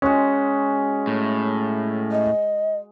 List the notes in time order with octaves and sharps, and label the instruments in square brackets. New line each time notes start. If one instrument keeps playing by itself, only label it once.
[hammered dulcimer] G#3 F#4 [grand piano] C#4
[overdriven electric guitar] A2
[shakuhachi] D#5